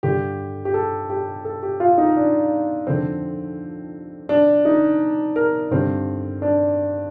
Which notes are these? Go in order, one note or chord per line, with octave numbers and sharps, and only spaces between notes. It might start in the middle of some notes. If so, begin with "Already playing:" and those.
G2 D3 G4
G4
A4
G4
A4
G4
F4
D#4
D4
F2 D3 C4
D4
D#4
A#4
G2 D3 C4
D4